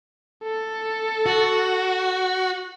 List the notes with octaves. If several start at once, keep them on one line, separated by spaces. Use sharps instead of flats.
A4
F#4